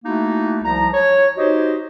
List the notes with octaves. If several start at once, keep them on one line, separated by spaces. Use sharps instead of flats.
A3 A#3 D#4 E4 F#4
C2 F3 A#5
C#5
D#4 F#4 G4 C5 D#5